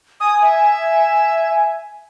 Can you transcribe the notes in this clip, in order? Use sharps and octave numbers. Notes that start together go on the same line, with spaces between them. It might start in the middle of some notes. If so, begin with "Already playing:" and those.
G#5 D#6
E5